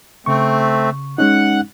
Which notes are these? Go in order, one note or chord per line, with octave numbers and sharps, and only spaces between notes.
C#3 A3 C4 C#6
G#3 C#4 D#4 F#5